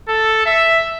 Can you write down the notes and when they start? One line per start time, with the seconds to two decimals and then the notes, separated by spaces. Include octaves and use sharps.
0.08 A4
0.46 E5